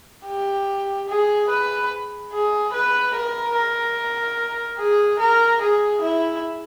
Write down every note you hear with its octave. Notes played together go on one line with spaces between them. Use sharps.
G4
G#4
B4
G#4
B4
A#4
A#4
G#4
A#4
G#4
E4